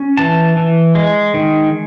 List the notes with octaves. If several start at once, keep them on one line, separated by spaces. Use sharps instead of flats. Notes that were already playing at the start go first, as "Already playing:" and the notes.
Already playing: C#4
E3 A5
E3
G#3
D#3